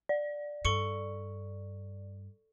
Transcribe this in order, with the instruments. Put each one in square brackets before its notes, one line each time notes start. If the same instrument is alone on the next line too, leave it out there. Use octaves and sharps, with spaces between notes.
[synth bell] D5
[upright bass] G2 [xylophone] A4 C#6 C#7